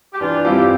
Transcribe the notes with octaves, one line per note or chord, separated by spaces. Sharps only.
G4
E3 D4 F4
G3 C4 E4 F4 G4